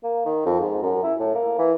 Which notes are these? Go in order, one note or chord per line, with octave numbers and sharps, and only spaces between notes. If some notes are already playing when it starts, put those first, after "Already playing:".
A#3
D#3
F2
G#2
F#2
E4
A2
A#3
E3